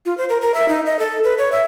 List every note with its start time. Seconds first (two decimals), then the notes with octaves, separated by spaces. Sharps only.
0.06 F4
0.18 C5
0.29 A#4
0.41 A#4
0.54 E5
0.69 D#4
0.86 D#5
0.99 A4
1.24 B4
1.38 C#5
1.52 E5